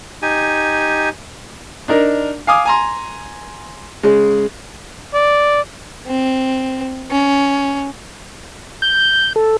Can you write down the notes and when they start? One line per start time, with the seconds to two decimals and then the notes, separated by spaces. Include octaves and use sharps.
0.22 D#4 G4 G#5
1.88 D4 D#4 A#4
2.47 F5 G#5 D6 D#6
2.65 G#5 A#5 C6
4.03 C#3 G#3
5.14 D5
6.07 C4
7.11 C#4
8.82 G6
9.36 A4